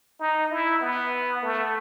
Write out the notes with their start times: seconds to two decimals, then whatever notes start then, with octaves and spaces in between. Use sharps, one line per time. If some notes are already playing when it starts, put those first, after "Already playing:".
0.20 D#4
0.51 E4
0.81 B3
1.43 A3